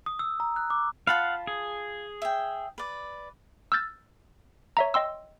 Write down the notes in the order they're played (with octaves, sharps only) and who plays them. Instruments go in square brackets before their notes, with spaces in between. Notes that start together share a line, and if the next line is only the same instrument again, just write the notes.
[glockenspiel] D#6
E6
A#5
F#6
D6
[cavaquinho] F4 A5 B5 [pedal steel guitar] F5 F#5
[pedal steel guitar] G#4
[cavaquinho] E5 G5
B4 D5
[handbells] E6 F6 G6 A6
C#5 E5 A#5
D#5 G5 C6 E6